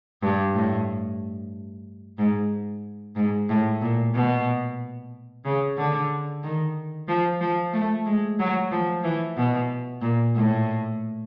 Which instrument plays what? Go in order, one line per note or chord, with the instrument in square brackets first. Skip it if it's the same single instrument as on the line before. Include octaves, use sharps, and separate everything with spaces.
[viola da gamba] G2
A2
G#2
G#2
A2
A#2
B2
C#3
D3
D#3
F3
F3
A3
G#3
F#3
F3
E3
B2
A#2
A2